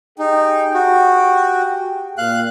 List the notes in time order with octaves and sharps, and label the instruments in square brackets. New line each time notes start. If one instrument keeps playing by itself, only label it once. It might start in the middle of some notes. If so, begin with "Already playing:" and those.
[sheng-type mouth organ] D#4 [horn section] G4 G#4 G5
[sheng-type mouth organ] F#4
[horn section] A#2 [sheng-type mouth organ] F5 F#6